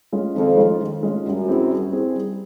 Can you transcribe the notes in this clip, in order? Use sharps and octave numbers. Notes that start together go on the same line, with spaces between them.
G#3 C#4 F4
F2 D#3
G#3 C#4 F4
D#3
G#3 C#4 F4
F#2 G3
C4 E4 G#4
G3
C4 E4 G#4
G3